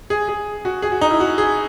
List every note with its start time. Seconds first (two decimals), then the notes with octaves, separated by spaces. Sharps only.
0.10 G#4
0.29 G#4
0.65 F#4
0.82 G#4
0.92 F#4
1.01 D#4
1.11 E4
1.20 F#4
1.38 G#4